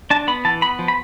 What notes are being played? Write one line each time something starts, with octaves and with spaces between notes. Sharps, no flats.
D4 A5
B3 B5
E3 A5
B3 B5
F3
B5